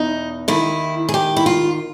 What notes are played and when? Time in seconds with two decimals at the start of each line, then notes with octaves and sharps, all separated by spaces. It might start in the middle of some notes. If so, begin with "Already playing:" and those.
Already playing: E2 B2 D#4
0.48 D#2 D#3 E4
1.09 G#4
1.14 G4
1.37 E4
1.46 F4